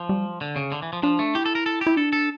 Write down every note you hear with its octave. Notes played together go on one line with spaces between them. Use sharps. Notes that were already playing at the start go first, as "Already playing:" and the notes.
Already playing: F3
G3
D3
C#3
D3
E3
F3
F3 D4
A3
E4 G4
A4
A#4
A4
G4
E4
D4 A4
A4